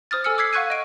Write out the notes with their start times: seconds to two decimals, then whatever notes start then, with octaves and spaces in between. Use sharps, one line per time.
0.11 C5 D#6 F6 A6
0.24 A4 G#5 E6 F6 C#7
0.38 D6 E6 G#6 B6 C7
0.53 F5 F#5 C#6 F#6 G#6 D#7
0.70 D#5 D7